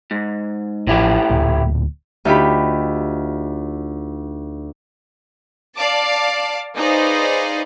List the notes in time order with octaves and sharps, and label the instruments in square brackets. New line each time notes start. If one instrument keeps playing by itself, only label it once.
[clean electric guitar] G#2
[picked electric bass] A1 F3 [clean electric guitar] A2 E4 G4
[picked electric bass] D1 D2 A#2
[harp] D2 D#4 F4 G4 B5
[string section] D5 F5 A5 D6
D#4 G#4 B4 C5 D5 F5